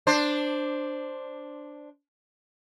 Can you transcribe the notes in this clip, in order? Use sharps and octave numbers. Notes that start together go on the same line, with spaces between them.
D4 C5